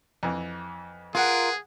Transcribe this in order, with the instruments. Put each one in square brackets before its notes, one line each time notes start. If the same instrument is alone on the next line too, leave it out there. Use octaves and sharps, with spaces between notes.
[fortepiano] F2 E3
[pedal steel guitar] F4 A#4 [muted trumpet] G#4 [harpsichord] B4 F#5